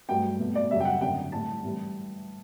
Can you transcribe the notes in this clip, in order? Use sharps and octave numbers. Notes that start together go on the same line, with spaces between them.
G2 F#3 A3 G5
B2 F#3 A3
D5
F#2 C#3 G3 E5
G5
F#5
F#2 D3 F#3 G5
A2 G3 A5
A2 E3 G3